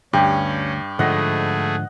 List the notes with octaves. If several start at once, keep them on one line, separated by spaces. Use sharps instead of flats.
D2 G2 C#4 G4
G#2 D3 F3 A3 G#4 D#5 F#5